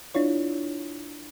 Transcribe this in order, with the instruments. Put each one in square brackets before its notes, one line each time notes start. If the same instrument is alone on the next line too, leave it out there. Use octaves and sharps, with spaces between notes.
[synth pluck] D4 E4 F4 C#5